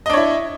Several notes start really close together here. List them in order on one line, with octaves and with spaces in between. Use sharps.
D#5 D4 C#5 E4